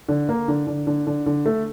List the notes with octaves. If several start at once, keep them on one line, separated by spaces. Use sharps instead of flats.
D3
A#3
D3
D3
D3
D3
D3
A3